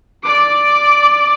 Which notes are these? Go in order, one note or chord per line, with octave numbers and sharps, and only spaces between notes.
D5 D6